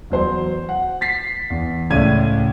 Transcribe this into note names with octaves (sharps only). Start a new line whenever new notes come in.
E2 F#3 C5 C6
F#5
A6 B6 C7
E2
C#2 A2 C#4 D5 G#6 D#7